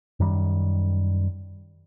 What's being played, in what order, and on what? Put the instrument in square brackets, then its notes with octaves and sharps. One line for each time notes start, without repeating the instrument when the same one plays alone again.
[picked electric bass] F#2 D#3 G3